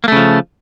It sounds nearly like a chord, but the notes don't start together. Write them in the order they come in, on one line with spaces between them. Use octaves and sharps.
A#3 A3 C#3 F3